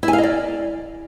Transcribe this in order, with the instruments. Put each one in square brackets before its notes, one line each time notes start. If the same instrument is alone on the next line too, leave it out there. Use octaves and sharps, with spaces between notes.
[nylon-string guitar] E4
G#5
F5
D#5
D5